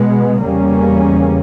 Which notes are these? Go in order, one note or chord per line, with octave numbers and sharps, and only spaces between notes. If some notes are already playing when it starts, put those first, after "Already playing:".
Already playing: B2 G#3 B3
E2 C#3 G3 A#3 C#4